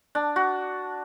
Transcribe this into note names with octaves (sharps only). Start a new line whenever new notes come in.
D4
F#4